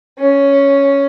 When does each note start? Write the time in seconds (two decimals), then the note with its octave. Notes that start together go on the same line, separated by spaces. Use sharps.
0.19 C#4